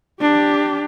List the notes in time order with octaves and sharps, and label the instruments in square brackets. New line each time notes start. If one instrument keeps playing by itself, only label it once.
[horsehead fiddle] D4 G4